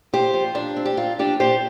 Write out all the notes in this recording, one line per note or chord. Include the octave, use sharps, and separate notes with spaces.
A#2 G4 C5
F3
A#2 D4
C4
G4
A#2 F4
F3 D4 G4
A#2 G4 C5